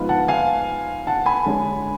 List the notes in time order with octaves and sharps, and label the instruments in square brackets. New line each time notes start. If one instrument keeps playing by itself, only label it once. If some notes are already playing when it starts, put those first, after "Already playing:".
Already playing: [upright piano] G#2 F3 B3 F4 B4
[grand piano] F#5 A5
F5 G#5
F#5 A5
G#5 B5
[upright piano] D3 G#3 C#4 G#4